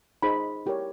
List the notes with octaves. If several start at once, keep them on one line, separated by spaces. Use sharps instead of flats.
D#4 G#4 C5 B5
E4 G4 A#4 C#5